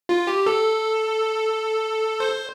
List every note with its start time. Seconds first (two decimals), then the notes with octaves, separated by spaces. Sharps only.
0.09 F4
0.27 G4
0.46 A4
2.20 C5